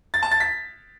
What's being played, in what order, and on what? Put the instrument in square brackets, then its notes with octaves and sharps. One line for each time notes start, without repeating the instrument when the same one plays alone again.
[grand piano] A6
A5
A6
B6